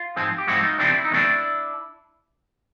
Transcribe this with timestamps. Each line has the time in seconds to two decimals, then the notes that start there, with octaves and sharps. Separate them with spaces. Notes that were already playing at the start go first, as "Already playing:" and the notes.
Already playing: F4
0.16 G#2 F3 G#3 C4
0.38 G4
0.47 G#2 F3 G#3 C4 E4 F#4
0.63 D#4 F4
0.78 E2 C3 F3 A3 C4 D4 E4
0.94 E4
1.04 D#4
1.10 E2 C3 F3 A3 C4 D4 E4